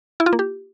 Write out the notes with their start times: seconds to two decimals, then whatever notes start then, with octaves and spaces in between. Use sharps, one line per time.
0.20 E4
0.26 F4
0.33 A#3
0.39 G4